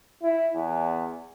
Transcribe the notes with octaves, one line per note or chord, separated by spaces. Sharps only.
E4
E2